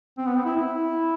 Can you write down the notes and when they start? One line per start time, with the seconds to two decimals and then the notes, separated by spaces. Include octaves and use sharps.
0.18 C4
0.25 B3
0.35 C4
0.45 E4
0.56 E4